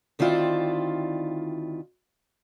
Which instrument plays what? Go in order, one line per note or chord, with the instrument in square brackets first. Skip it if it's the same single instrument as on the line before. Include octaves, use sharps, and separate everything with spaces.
[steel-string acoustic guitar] D2 D#3 C4 E4 F4 D5